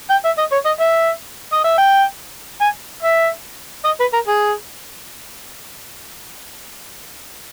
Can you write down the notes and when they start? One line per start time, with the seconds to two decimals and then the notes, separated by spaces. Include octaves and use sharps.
0.10 G5
0.25 E5
0.38 D#5
0.52 C#5
0.66 D#5
0.80 E5
1.52 D#5
1.64 E5
1.78 G5
2.61 G#5
3.03 E5
3.85 D#5
4.00 B4
4.13 A#4
4.27 G#4